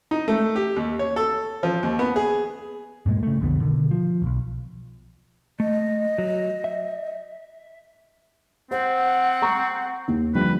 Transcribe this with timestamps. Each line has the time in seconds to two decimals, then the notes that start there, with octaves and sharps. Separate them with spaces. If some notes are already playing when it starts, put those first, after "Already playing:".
0.11 D#4
0.28 A3
0.56 G4
0.76 D#2
0.99 C#5
1.16 A4
1.63 F3
1.83 D#2
1.99 B3
2.16 G#4
3.06 G2 A#2 G#3
3.23 C#3 A3
3.41 B1 F2 D3 B3
3.61 B2 D3 D#3
3.91 F3
4.22 E1 B1
5.60 A3 D#5
6.18 F#3
6.64 E5
8.71 C4 C5 F#5
9.42 A#5 C#6
10.08 D#2
10.35 D3 F3 G3 B4